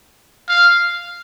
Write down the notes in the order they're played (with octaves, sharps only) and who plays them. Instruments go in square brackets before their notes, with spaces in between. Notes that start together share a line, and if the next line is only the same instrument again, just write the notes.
[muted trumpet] F5